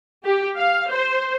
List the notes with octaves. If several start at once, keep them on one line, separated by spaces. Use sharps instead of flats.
G4
F5
C5